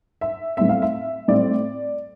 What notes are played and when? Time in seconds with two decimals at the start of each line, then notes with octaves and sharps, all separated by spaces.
0.21 E5
0.57 A2 G3 C4 E5
0.69 F5
0.82 E5
1.28 A2 G3 C4 D5